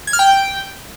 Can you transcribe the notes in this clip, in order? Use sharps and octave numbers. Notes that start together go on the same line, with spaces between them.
G#6
F6
G5